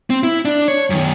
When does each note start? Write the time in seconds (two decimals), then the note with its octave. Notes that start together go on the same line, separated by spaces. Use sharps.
0.10 C4
0.23 E4
0.45 D4
0.68 C#5
0.90 F#2 D#3